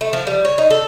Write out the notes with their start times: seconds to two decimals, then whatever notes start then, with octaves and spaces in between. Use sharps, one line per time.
0.01 A3
0.13 F3
0.27 G3
0.45 C#5
0.58 D#4
0.70 A4